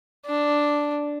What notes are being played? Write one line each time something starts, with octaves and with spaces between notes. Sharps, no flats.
D4